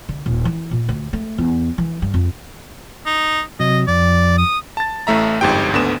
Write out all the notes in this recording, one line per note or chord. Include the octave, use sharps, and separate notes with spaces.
D3
D#1
E3
A#2
D2
A3
E2
E3
G2
F2
D#4
C3 F#3 D#5
F2 D5
D#6
A5 A6
A1 A2 A3 E5 A#5
G1 F2 G#2 G4 G5
G#1 D2 D3 B3 E7